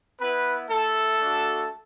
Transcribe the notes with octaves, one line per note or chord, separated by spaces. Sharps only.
B3 E4 B4
A3 E4 A4
A3 D4 F#4